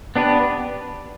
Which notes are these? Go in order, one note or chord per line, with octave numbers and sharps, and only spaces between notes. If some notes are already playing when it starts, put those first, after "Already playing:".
B3 D4 G4 B4